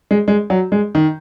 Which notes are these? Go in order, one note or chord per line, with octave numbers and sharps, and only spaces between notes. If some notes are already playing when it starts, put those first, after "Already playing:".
G#3
G#3
F#3
G#3
D#3